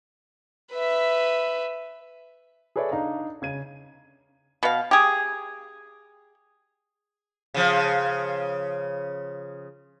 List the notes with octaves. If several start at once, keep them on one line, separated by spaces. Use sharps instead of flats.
B4 E5
G#4 A4 B4 C#5 D5 E5
D4 D#4 F5 A#5
C#3 G#6 D#7
B2 F5
G4 G#4
C#3 F3